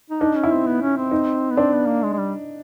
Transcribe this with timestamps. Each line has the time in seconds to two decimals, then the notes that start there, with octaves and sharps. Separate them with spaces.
0.10 D#4
0.21 D4 D#4
0.36 C#4
0.43 E4
0.51 C4
0.66 B3
0.82 C#4
0.97 C4
1.11 D#4
1.51 B3
1.57 C4 D4
1.72 B3
1.87 A#3
2.03 G#3
2.13 G#3
2.18 G3